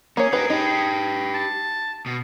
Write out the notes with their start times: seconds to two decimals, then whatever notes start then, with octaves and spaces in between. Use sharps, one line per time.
0.17 A#3 C#4 G#4 C#5
0.32 C#4 D#4 G4 A#4 B4
0.50 D#4 G4 B4
1.34 A5
2.06 B2